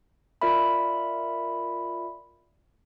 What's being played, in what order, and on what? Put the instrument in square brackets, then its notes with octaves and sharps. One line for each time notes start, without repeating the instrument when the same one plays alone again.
[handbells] F4 A#4 D5 E5 B5